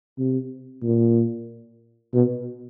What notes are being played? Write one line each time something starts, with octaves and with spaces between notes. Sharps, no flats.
C3
A#2
B2